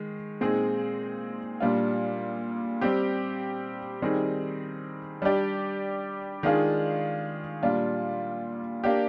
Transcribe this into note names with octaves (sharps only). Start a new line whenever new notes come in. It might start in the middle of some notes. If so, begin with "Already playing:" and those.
Already playing: D#3 G#3
A#2 G#3 C4 D#4 G#4
A#2 G3 D4 F4
G3 C4 G4
D#3 G3 C4 D#4 G#4
G3 D4 G4 D5
D#3 G#3 D4 F4 G#4
A#2 G3 D4 F4
A#3 D4 G4